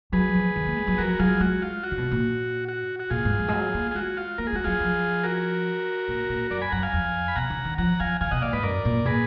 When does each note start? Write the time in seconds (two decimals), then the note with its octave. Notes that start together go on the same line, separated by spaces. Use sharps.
0.12 F#3 G#4 B4
0.35 F3
0.56 D#3
0.66 A#3
0.77 G#3
0.87 F#3
0.98 F3 F#4 A#4
1.19 F#3 F4 G#4
1.40 G#3 F#4
1.62 F4
1.83 F#4
1.91 D3
1.98 B2
2.12 A#2
2.69 F#4
3.00 F#4
3.10 A#2 F4 G#4
3.25 G#2
3.39 F3
3.48 G#3
3.53 F#3
3.74 A#3
3.91 G#4
3.95 G#3 F#4
4.17 F4
4.38 A#3 A#4
4.47 G#4
4.53 G#3 F#4
4.64 F#3 F4 G#4
4.80 F3
5.24 F#4 A#4
6.08 A#2
6.29 A#2
6.51 F#2 A#4 D5
6.61 G#5 B5
6.72 F#2 F#5 A#5
6.83 F5 G#5
6.93 F2
7.28 B5
7.36 B2 F#5 A#5
7.50 D3
7.65 D#3
7.78 F3 F#5 A#5
8.00 F3 F5 G#5
8.21 D#3 F5 G#5
8.31 B2 D#5 F#5
8.42 A#2 D5 F5
8.53 G#2 B4 D#5
8.63 F#2 A#4 D5
8.85 A#2
9.05 A#2 G#4 B4